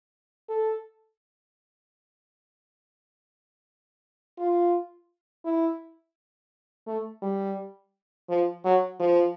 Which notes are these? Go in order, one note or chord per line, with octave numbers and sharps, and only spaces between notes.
A4
F4
E4
A3
G3
F3
F#3
F3